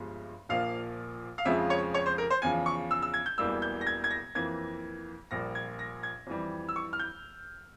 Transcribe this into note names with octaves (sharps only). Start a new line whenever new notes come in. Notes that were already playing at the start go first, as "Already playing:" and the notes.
Already playing: G1 G2 F3 G#3
A#1 A#2 F3 A#3 F5
F5
F2 C#3 F3 G#3 E5
C#5
C#5
C5
A#4
C5
E2 C#3 F3 G#5
C#6
E6
E6
G#6
G6
E1 E2 E3 G3 A#3 E6
G6
A#6
G#6
G#6
A#6
F2 E3 A#3 G#6
A#1 A#2 G3 A#3 A#6
G#6
A#6
G#6
F2 E3 G3
E6
C#6
F6
G6